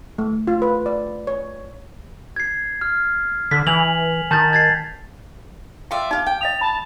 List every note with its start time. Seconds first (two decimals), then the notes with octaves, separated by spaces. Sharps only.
0.18 A3
0.47 F4
0.62 B4
0.86 D5
1.27 C#5
2.36 G#6 C7
2.81 F6
3.51 D3 B6
3.67 E3 G#5 F7 F#7
4.31 D#3 A5 G6 A6
4.53 G#6 A6 C7
5.91 F4 D5 E5 G5
6.11 D#4 G4 F5
6.26 G5
6.41 D#5 F5 D#6 F7
6.61 A5 B5